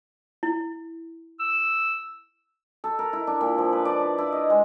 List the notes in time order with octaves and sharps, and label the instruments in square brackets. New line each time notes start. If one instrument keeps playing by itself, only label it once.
[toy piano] E4
[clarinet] E6
[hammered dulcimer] A4
A#4
E4
D4
A#2
F3
B4
D5
E4
E4
D#5
G#3